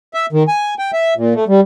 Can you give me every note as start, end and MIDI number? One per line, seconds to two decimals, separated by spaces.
0.14 0.26 76
0.32 0.43 51
0.48 0.74 80
0.79 0.91 79
0.93 1.14 76
1.17 1.34 46
1.35 1.44 57
1.48 1.61 55